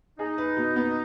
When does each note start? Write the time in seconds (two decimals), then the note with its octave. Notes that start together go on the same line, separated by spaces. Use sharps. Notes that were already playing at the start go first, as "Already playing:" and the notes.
0.19 D#4 G#4
0.38 B4
0.57 B2
0.76 B3